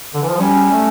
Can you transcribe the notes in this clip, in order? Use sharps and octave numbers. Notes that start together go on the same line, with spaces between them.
D3
E3
F3
G3 C#4
A3